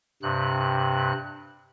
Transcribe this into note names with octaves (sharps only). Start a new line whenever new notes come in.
G2 C3 F#6